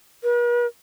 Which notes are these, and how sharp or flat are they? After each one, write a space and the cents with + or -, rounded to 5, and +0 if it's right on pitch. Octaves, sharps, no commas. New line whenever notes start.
B4 -45